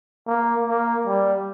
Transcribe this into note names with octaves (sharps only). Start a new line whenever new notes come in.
A#3
A#3
G3